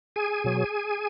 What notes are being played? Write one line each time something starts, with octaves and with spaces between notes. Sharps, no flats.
G#4 G#5
B2 F#3